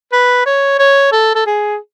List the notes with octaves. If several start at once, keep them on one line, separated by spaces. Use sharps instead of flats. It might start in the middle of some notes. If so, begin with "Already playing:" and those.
B4
C#5
C#5
A4
A4
G#4